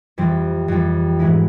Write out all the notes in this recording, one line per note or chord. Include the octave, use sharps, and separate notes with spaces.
F2 E3 G3 C4
F2 E3 G3 C4
G#2 E3 G#3 E4